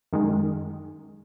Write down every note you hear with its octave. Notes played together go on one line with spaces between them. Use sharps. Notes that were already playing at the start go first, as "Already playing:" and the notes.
F#2 D#3 G#3